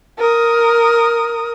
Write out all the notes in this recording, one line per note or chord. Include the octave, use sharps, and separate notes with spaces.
A#4 D#6